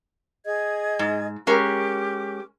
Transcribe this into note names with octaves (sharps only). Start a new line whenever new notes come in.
G#4 D#5 G#6
G#2
G#3 C#4 G4 A#4 D6